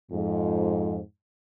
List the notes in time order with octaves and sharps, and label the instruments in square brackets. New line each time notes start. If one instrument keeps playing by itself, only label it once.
[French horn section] F2 G#2